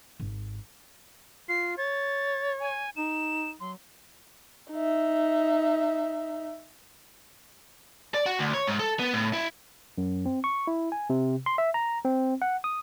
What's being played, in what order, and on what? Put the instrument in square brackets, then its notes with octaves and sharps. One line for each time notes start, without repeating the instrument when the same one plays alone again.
[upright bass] G#1
[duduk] F4 [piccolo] C7
[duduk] C#5 [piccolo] A6
[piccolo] G#5
[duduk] D#4 [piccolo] E7
[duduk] F#3 [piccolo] C6
[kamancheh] D#4 E5
[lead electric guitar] D5
F#4
D2
C#5
G#2
A4
B3
A2
E4
[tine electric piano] F#2
C4
C#6
E4
G#5
C3
C6
E5
A#5
C4
F#5
D#6